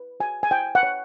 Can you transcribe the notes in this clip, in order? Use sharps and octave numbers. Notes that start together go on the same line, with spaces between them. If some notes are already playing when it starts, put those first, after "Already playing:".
Already playing: B4
F#4 G#5
G#5
E4 G5
F#5
C#5